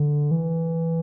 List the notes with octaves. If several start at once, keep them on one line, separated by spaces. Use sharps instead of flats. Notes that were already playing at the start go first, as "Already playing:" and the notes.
Already playing: D3
E3